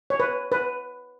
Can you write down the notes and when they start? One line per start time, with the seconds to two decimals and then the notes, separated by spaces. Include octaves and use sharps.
0.10 C#5
0.20 B4
0.52 B4